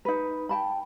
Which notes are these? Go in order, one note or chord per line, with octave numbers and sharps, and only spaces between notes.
D#4 B4
G5 A5 B5